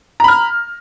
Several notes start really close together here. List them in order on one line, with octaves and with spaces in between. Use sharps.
A#5 B5 F6